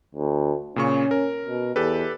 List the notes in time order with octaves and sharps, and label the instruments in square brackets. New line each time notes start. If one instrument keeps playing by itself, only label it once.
[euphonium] D2
[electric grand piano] A#2 C#3 C#6 [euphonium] C#4
[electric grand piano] A#4
[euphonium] B2
[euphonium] E2 [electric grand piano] G4 A4 B4